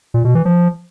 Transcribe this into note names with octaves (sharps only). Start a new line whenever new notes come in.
A#2
B2
E3
F3